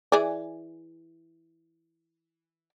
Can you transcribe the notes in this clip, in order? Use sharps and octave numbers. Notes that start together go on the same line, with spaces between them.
E3 G#4 D5